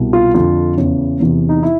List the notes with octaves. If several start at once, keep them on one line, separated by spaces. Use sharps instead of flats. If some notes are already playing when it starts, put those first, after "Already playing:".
Already playing: C2 B2
F4
F2 D3 F3 F4
E2 C#3 E3
E2 C3 E3
D#4
E4